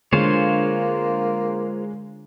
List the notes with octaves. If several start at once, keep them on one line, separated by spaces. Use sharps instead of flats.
D3 G#3 A#3 F4 C5 C#5